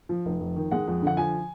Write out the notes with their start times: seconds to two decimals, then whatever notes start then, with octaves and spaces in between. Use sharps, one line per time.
0.09 F3
0.26 F1
0.40 F2
0.56 D#3
0.71 G#3 F#5
0.88 F2
1.02 D3 F#5
1.17 F3 G#5